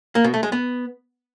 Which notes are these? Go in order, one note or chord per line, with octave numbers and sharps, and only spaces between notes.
A#3
B2
A3
G#3
B3